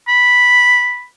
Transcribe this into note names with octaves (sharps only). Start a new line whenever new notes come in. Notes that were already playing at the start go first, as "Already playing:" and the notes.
B5